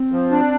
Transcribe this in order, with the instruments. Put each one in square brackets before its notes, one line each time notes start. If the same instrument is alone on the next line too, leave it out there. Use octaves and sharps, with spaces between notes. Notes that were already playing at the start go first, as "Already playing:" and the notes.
Already playing: [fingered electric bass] C4
[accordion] F3
D4